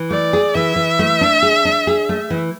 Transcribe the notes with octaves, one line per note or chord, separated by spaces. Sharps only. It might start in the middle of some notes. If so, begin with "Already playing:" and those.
Already playing: E3
A3 D5
G#4
E3 E5
E3
A3
D4
G#4
D4
G#4
A3
E3